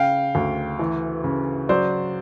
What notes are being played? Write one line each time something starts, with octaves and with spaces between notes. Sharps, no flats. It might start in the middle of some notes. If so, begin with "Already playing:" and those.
Already playing: C#3 F5 G5
D2
E3
C#3
F#3 C5 D5